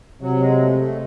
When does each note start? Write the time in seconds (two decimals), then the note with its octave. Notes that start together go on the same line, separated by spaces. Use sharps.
0.21 C3 F#3
0.40 G#3
0.59 A3
0.78 A3